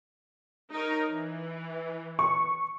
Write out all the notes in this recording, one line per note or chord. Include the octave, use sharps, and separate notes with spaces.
D#4 A#4 C#5
E3
C#6